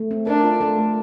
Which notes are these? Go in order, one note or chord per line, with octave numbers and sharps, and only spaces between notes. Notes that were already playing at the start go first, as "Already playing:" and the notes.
Already playing: A3
C4
D4 A#4
F4
A3
A3